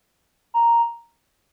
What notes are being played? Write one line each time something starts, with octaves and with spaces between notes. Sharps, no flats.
A#5